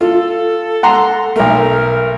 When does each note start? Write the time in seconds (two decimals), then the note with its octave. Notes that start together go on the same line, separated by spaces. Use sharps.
0.01 F4 A4
0.83 F#5 A#5 C6
1.36 B1 A3 A#4